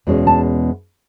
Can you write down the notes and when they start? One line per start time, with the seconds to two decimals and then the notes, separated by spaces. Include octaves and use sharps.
0.07 E2 B2 G#3 C#4
0.27 A5